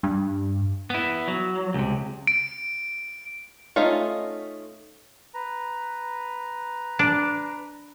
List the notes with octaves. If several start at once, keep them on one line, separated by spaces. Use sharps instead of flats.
G2
B3 E4
F#3
C#2 C3
D7
A3 C#4 D#4 F4
B4 A#5
D4